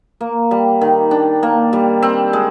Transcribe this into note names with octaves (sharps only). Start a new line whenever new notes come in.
A#3
G3
D#3
D4
A#3
G3
C4
G#3